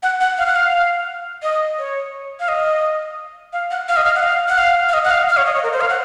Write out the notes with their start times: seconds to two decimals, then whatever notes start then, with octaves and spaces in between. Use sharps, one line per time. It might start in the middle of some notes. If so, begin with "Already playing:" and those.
0.03 F#5
0.21 F#5
0.38 F5
0.46 F#5
0.56 F5
1.43 D#5
1.79 C#5
2.40 F5
2.48 D#5
3.53 F5
3.71 F#5
3.88 F5
3.97 D#5
4.05 F5
4.15 F#5
4.23 F5
4.48 F#5
4.58 F5
4.89 F5
4.94 D#5
5.04 F#5
5.11 F5
5.29 F5
5.37 C#5
5.46 D#5
5.55 C#5
5.63 A#4
5.73 C5
5.81 F5
5.90 F#5